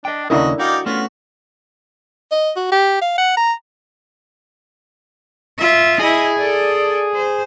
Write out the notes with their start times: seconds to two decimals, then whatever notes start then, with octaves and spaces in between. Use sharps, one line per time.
0.05 D4 D#5 G5
0.30 D#2 C#3 C#4 D4 E4 F#4 A#4 D#5
0.59 D#4 F#4 D5 F5 G5
0.86 A3 B3 C#4 F4 F#4
2.31 D#5
2.56 F#4
2.72 G4
3.02 F5
3.18 F#5
3.37 A#5
5.58 F4 E5
5.99 E4 G#4 D#5
6.38 A4 D5
7.14 C5